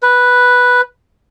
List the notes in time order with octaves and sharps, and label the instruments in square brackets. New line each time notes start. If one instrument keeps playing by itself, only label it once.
[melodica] B4